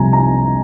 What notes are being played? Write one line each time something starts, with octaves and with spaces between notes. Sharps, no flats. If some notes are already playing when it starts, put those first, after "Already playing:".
Already playing: C2 C3 F3 G#5 A#5
A#5